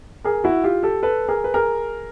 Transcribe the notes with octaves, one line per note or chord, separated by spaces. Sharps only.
G#4 A#4
E4 F#4
F4 G4
G4 A4
A4 B4
G#4 A#4
B4
G#4 A#4